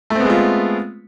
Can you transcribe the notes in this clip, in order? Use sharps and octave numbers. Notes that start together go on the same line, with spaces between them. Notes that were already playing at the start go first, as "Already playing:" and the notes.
G#3 A3 B3 C4 F4